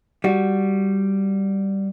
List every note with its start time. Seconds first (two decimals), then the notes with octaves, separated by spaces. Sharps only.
0.24 G3 F#4